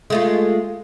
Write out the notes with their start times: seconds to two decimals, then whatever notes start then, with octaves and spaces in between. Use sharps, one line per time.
0.10 G#3 A3 F4